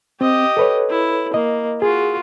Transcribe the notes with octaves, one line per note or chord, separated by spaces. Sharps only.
C4 G4 D#5
A4 B4 C#5
E4
A#3 D#5
F4 F#4 G#4